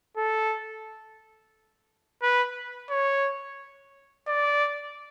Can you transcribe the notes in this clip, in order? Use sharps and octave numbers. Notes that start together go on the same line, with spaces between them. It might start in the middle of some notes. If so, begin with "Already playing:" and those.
A4
B4
C#5
D5